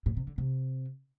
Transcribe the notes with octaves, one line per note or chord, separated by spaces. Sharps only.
A2
C3
D3
C3